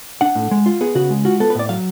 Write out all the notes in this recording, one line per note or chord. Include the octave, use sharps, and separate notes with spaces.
D4 F#5
A2
G#3
F4
B3 G#4
C#3 F#4
G#3
F4 F#4
B3 A4
B4
A2 D5
F#3 F5